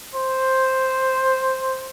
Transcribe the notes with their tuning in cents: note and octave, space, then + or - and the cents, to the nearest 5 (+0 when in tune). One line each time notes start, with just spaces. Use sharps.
C5 +5